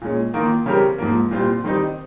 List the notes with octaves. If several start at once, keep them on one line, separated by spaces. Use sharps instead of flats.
A#2 G#3 C#4
D#3 A#3 F4
C#3 G3 C4 G4 A#4
G#2 F3 A#3
A#2 G3 C4 F4 C5
D#3 G3 C4 D#4